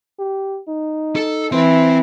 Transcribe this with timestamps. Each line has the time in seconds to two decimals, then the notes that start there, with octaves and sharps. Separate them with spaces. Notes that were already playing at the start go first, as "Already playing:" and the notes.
0.19 G4
0.68 D#4
1.16 A4
1.52 E3 C4 C6